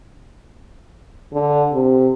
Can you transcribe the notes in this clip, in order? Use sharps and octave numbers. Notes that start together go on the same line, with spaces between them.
D3
C3